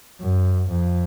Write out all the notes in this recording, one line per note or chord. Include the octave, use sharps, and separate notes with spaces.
F#2
F2